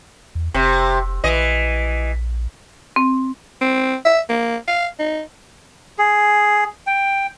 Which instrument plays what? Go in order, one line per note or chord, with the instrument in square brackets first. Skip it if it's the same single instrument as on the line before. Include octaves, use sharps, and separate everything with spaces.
[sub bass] E2
[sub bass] F1 [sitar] C3
[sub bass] A#1 [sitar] E3 D#5
[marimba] C4
[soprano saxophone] C4
E5
A#3
F5
D#4
[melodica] G#4
G5